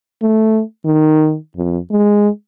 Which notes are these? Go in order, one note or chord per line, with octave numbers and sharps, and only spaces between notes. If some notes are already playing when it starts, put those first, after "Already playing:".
A3
D#3
F2
G#3